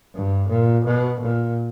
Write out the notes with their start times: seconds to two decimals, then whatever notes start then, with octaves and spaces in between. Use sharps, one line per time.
0.15 G2
0.49 A#2
0.85 B2
1.21 A#2